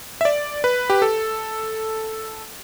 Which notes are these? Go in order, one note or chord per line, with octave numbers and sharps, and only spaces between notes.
E5
D5
B4
G4
A4